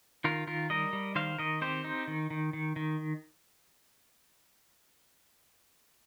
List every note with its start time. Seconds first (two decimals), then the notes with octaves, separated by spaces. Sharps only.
0.24 D#3 F4 A#4
0.47 D#3 F4 A#4
0.70 G3 A#4 D#5
0.93 G3
1.15 D#3 C5 F5
1.38 D#3 A#4 D#5
1.61 C4 G4 C5
1.84 D#4
2.08 D#3
2.30 D#3
2.53 D#3
2.76 D#3